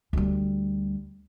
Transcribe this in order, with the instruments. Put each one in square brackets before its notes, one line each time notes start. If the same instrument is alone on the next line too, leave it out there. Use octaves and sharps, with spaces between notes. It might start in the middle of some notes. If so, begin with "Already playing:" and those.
[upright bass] D2 G3